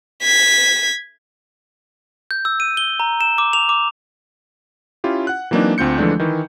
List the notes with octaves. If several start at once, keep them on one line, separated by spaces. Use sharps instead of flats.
G#6 B6
G6
E6
D#7
G7
A#5
E7
D6
F7
D6
C#4 E4 F4 G4
F#5 F#6
E3 F#3 A#3 C4 D4 D#4
D2 C4 F4 G6 C#7
D3 E3 F3 G#3 A3 D4
D#3 E3